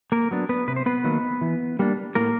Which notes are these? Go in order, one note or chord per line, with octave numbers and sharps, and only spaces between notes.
A#3 A#4
F#3 B3 D4
B3 B4
C3 B4
C5
B3 B4
D#3 F#3 A#3
E3
G3 A#3 D4
A2 A#3 A#4